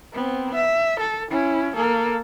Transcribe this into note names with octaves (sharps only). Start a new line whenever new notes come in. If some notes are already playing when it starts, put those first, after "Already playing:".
B3 C4
E5
A4
C#4 E4
A#3 A4